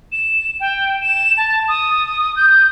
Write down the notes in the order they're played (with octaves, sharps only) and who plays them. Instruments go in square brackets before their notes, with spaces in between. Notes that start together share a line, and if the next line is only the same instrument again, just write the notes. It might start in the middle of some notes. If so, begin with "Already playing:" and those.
[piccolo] E7
G5
E7
A5
D#6
G6